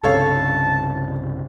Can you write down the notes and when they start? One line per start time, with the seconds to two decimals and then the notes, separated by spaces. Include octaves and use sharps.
0.04 C2 G2 C#3 A4 C#5 F5 A5